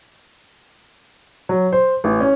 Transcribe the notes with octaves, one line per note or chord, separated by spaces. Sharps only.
F#3
C5
A1
C#4